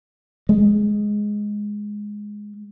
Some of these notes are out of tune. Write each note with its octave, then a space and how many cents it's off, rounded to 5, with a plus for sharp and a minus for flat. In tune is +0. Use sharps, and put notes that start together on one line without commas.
G#3 +0